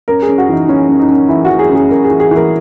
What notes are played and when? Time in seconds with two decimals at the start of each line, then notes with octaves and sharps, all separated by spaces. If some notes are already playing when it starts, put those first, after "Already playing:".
0.08 F#2 A#4
0.23 G#4
0.29 F#2
0.38 F#4
0.49 E3 D#4
0.68 E3 C#4
0.89 F#2
0.99 D#4
1.09 F#2
1.29 E3 E4
1.45 F#4
1.50 E3
1.59 G#4
1.69 F#2
1.75 G#4
1.90 F#2 A#4
2.05 G#4
2.10 E3
2.20 G#4
2.31 E3 A#4